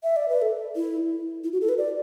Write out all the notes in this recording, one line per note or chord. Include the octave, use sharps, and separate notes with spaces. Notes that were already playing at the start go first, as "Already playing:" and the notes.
E5
D5
B4
A4
E4
E4
F#4
A4
B4
D5